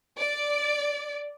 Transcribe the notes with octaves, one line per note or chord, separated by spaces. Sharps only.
D5